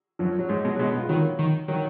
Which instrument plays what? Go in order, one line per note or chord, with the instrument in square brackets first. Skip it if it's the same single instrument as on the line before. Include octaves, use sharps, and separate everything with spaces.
[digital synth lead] F#2 [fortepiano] F3
[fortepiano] F#3
[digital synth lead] G#2 [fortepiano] G#3
[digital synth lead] B2 [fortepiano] G#3
[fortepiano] F#3
[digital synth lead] B2 [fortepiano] G#3
[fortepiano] B3
F4
[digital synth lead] D#3 [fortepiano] F#3
[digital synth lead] D#3
[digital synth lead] D#3 [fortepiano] F#3